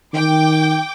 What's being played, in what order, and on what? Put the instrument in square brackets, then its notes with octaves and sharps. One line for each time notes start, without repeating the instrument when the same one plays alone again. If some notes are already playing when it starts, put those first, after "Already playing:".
[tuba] D#3 [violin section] G5 D6